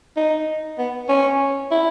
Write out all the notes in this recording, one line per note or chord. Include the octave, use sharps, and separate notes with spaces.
D#4
B3
C#4
E4